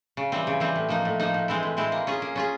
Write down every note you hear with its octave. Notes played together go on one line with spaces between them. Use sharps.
C#3
E3 G3 C4
C#3
E3 G3 C4
A2
F3 A#3 D#4
A2
F3 A#3 D#4
A2
E3 G#3 C4 E4
A2
E3 G#3 C4 E4
A#3
C#4 F4 G#4
A#3
C#4 F4 G#4